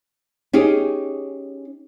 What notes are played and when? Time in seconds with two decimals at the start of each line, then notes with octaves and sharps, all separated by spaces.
0.53 C#4 D#4 G4 G#4